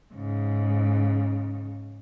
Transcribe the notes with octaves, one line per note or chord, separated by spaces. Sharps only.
G#2 C#3